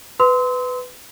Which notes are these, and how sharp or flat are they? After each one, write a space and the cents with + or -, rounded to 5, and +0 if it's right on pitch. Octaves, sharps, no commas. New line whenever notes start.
B4 +15 C6 -20 E6 -45